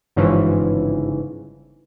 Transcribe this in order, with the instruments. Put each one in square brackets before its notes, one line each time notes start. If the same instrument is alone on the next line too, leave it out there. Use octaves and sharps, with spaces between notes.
[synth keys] G1 G#2 C#3 E3 F3